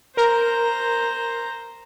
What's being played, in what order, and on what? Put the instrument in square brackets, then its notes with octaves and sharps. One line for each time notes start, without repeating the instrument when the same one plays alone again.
[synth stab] A#4 [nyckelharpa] C5 A#5